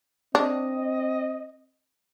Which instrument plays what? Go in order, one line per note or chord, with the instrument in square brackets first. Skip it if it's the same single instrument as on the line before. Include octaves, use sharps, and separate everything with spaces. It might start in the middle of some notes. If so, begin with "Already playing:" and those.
[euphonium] C4 [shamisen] D4 [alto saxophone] D#5